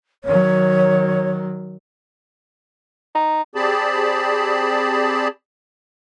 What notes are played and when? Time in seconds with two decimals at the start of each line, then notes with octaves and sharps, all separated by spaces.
0.24 D#3 F#3 C#5
3.15 D#4
3.55 C4 G4 G#4 D5 A5 B5